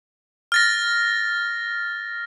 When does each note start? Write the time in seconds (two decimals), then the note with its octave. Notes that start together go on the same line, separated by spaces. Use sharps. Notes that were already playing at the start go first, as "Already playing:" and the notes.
0.52 F6 A6 A#6